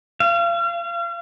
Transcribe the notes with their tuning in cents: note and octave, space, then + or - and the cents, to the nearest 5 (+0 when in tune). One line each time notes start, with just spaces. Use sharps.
F5 -35